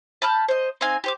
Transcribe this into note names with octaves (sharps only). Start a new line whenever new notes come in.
A5 B5 F6 G6
C5 D#5
C4 D#4 F5 G#5
G4 C5 D6